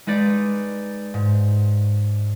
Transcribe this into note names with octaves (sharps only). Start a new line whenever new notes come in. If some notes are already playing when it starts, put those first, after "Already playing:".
G#3 D#4 B4 D5
G#2